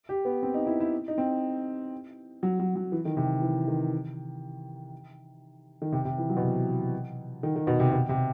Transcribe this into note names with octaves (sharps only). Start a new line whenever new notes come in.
G4
B3
C4
D#4
E4
E4
D#4
C4
F#3
F#3
F#3
E3
D#3
C3
E3
D#3
D#3
C3
C3
E3
F#3
B2
C3
D#3
D#3
B2
C3
B2
C3